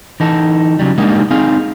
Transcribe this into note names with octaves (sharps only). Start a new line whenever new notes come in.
E3 D#4 A4
C#3 F#3 G3
G3 G#3 A#3 D4 D#4
C4 D#4 G#4 F5